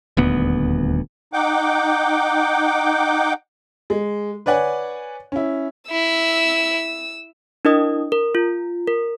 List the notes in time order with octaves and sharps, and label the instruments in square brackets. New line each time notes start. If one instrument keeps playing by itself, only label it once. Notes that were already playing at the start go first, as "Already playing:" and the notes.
[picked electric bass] D#1 D2 B3
[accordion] D#4 F#5 G5 D6 G6
[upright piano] G#3
B4 C#5 D5 F#5 G#5
C#4 E4
[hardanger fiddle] E4 [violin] E6
[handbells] D4 E4 A#4 D#5 D#6
A#4
F4
A#4